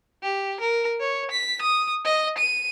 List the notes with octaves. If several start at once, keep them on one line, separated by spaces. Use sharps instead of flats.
G4
A#4
C#5
B6
D#6
D#5
D#7